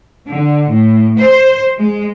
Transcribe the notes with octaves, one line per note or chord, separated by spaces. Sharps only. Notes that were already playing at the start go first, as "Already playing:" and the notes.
D3
A2
C5
G#3